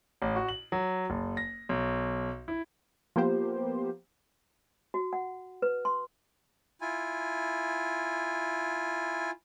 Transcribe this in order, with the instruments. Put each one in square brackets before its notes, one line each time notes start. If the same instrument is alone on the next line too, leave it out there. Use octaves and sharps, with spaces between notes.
[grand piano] A1
F#4
F#7
F#3
F#1
A#6
B1
E4
[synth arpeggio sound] F3 A#3 B3 G4 C5
[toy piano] F#4
F#5
B4
C6
[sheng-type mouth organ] E4 F4 G#5